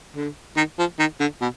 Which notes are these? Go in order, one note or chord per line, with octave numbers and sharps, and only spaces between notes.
D3
D#3
F3
D#3
D3
B2